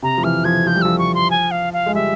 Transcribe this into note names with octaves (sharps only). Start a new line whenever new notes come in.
C3 A#5
F3
E3 F6
F3 G#6
F3 G6
G3
F3 E6
C#6
C6
G#5
F5
F5
G#3
G3 E5